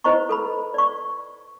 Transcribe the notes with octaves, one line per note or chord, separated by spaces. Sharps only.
E4 B4 C5 D#5 A#5 C#6
A4 B4 B5
D5 C#6